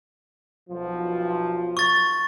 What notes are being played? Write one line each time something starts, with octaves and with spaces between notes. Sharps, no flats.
B1 F3
C#6 A6